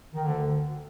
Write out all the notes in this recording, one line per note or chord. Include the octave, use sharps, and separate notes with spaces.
D#3
D2 D3